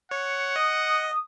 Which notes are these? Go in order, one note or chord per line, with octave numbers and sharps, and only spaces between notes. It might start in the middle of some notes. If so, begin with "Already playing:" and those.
C#5 F#5
D#5 D#6